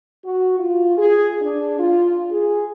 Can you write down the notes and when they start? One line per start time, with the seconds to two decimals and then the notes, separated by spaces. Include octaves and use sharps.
0.24 F#4
0.59 F4
0.97 G#4
1.41 D4
1.79 F4
2.31 G#4